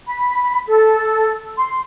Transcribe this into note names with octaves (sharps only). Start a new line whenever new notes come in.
B5
A4
C6